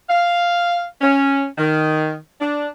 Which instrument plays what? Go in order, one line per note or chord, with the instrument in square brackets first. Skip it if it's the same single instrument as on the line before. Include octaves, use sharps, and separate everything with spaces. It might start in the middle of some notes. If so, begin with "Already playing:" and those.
[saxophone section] F5
C#4
D#3
D4